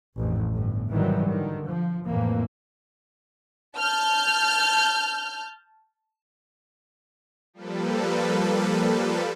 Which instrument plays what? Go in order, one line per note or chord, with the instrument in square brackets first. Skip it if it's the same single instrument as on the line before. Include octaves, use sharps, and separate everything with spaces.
[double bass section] A1 F2 G#2
G1 A2
G#2 C3 D#3 E3 F#3 G3
D3 D#3
F3
F2 A2 E3 A#3
[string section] A5 F6 G6
[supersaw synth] F3 G3 A#3 A4 B4